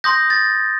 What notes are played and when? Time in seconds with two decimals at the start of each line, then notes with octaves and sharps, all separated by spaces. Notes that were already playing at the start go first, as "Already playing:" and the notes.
0.04 C6 D#6 G6 A#6
0.30 A6